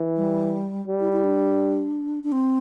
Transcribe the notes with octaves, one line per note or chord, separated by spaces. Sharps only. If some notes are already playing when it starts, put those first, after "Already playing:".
Already playing: E3
G3
G3
E4
E4
D4
D4
C4